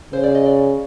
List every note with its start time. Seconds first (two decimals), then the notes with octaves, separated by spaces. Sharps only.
0.13 C#3 C5
0.24 D5
0.35 D#5
0.46 D5